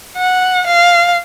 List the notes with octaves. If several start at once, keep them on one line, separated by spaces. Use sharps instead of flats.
F#5
F5